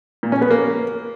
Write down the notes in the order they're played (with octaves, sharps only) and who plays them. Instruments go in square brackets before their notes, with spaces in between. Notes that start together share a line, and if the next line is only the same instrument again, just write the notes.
[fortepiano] A#2
C#4
B3
A#3